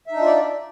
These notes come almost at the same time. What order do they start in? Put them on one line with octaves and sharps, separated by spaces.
E5 D#4 D4 F4 D5